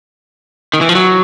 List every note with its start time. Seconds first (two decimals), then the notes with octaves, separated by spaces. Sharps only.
0.74 D#3
0.81 E3
0.89 F3
0.95 F#3